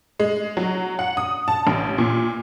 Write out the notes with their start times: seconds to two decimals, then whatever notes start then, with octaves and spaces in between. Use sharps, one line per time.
0.19 G#3
0.57 F#3
0.99 F#5
1.17 D#6
1.48 A5
1.67 A1
1.98 A#2